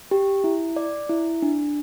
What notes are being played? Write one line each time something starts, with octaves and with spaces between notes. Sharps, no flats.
G4
E4
D5
E4
D4